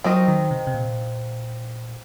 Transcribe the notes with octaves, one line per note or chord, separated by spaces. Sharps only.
F#3 C4 D#4 A#4 D#5
D#3
C3
C3
A#2